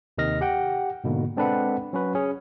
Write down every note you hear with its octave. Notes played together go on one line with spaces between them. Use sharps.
D#2 C3 D#3 D#5 F6 A#6
G4 F#5 G5
G#2 B2 D3 A#3
G#3 C4 D4 A4 B4 F#5
F#3 C#4 F#4 B4
C#4 G#4